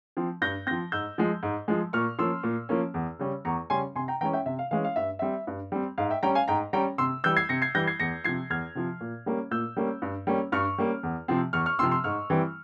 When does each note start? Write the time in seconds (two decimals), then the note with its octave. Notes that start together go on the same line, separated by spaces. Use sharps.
0.17 F3 C4
0.42 G2 G6 A#6
0.67 C4 G6 A#6
0.71 F3
0.92 G#2 E6 G6
1.18 F3 G#3
1.43 G#2
1.68 F3 G#3
1.93 A#2 C#6 F6
2.19 F3 A#3 C#4 C6 E6
2.43 A#2
2.69 F3 A#3 C#4
2.94 E2
3.19 C#3 G3 C#4
3.45 E2 A#5 C#6
3.70 C#3 G3 C#4 G#5 C6
3.96 C3 G#5 C6
4.08 G5 A#5
4.21 E3 G#3 C#4 G5 A#5
4.33 E5 G5
4.46 C3 E5
4.59 F5
4.71 E3 G#3 C#4 F5
4.84 F5
4.96 G2 E5
5.19 G3 C4 E5
5.47 G2
5.72 G3 C4
5.98 G#2 F5
6.10 E5 G5
6.23 G3 C#4 G5 A#5
6.35 F5 G#5
6.48 G#2 G5 A#5
6.73 G3 C#4 G5 A#5
6.98 C3 C6 E6
7.24 E3 G3 E6 G6
7.37 G#6 C7
7.49 C3 A#6 C#7
7.62 G#6 C7
7.75 E3 G3 G6 A#6
7.87 G#6 C7
8.00 E2 A#6 C#7
8.24 F3 G#6 C7
8.28 C3
8.50 E2 F6 G#6
8.75 C3 F3
9.01 A#2
9.26 G3 A#3 C#4
9.51 A#2 E6 G6
9.77 G3 A#3 C#4
10.02 G2
10.27 G3 A#3 C#4
10.52 G2 C#6 F6
10.78 G3 A#3 C#4
11.03 E2
11.28 C3 F3 C4
11.53 E2 C#6 F6
11.66 C#6 F6
11.79 C3 F3 C4 C6 E6
11.91 C6 E6
12.04 G#2 C#6 F6
12.30 E3 G3 C4